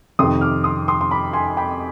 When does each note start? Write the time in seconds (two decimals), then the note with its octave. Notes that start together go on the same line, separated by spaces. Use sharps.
0.19 F2 C3 D#3 C6 D#6
0.41 D6 F6
0.64 C6 D#6
0.88 C6 D#6
1.01 C6
1.11 B5 D6
1.33 G#5 C6
1.57 G5 B5